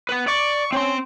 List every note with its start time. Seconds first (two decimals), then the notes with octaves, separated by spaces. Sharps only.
0.09 B3 B4
0.28 D5 C#6
0.72 C4 C#4 C6